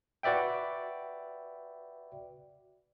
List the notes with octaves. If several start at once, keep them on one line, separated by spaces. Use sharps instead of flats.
F#4 B4 D5 E5 G5